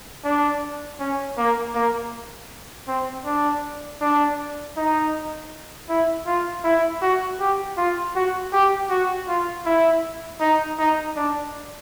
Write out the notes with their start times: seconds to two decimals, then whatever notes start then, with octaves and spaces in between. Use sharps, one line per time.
0.25 D4
1.00 C#4
1.38 A#3
1.75 A#3
2.88 C4
3.26 D4
4.01 D4
4.77 D#4
5.89 E4
6.26 F4
6.64 E4
7.02 F#4
7.40 G4
7.78 F4
8.16 F#4
8.53 G4
8.90 F#4
9.28 F4
9.66 E4
10.40 D#4
10.79 D#4
11.16 D4